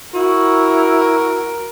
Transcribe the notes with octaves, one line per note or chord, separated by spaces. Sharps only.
E4 F#4 A#4